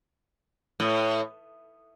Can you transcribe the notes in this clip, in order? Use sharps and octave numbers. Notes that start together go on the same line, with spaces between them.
A2